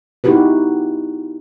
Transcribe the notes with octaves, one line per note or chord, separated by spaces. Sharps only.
B3 D#4 E4 F#4 G4 B4